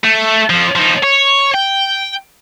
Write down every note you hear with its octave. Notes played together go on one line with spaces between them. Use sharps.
A3
F2 F3
F3 D#4
C#5
G5